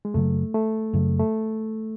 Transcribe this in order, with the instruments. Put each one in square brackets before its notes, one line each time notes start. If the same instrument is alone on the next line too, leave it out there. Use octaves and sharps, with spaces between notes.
[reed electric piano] G#3
[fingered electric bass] F#2 C#3 F#3 [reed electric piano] A3
[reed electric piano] A3
[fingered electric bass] F#2 C#3 F#3
[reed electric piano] A3